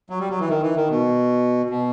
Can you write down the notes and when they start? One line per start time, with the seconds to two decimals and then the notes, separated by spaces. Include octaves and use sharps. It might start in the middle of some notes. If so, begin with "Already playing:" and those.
0.10 F#3
0.20 G3
0.30 F#3
0.40 E3
0.49 D#3
0.63 E3
0.76 D#3
0.90 B2
1.70 B2